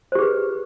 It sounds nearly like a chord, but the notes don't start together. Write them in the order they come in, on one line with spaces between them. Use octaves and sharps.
C5 G4 G#4 B4